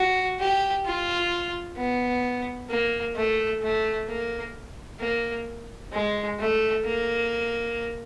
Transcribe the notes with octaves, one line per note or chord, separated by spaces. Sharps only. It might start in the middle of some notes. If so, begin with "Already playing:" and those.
Already playing: F#4
G4
F4
B3
A#3
A3
A3
A#3
A#3
G#3
A3
A#3